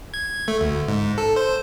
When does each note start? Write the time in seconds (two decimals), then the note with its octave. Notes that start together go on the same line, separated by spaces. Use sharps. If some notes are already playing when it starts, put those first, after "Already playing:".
0.14 G#6
0.48 A3
0.61 D2
0.88 G#2
1.18 A4
1.36 C5